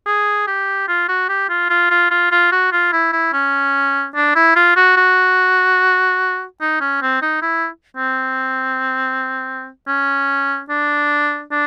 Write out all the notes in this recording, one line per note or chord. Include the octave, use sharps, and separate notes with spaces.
G#4
G4
F4
F#4
G4
F4
F4
F4
F4
F4
F#4
F4
E4
E4
C#4
D4
E4
F4
F#4
F#4
D#4
C#4
C4
D#4
E4
C4
C#4
D4
D4